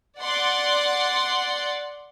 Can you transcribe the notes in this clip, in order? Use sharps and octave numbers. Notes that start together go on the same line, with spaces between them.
D5 F#5 C6